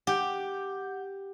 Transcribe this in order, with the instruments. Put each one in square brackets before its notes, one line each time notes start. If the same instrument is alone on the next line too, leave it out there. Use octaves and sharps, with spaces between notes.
[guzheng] G4 [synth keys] F#5 G6